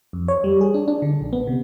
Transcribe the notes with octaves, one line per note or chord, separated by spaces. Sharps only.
F2
C#5
G3
G#4
D4
D4
D3
A#1
B3
C3